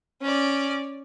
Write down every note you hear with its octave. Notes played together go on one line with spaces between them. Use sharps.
C#4 D5